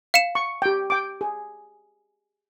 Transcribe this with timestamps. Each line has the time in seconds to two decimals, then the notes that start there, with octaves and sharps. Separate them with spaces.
0.14 F5 C#7 E7
0.35 C#6
0.62 G4 G5
0.90 G5 D6
1.21 G#4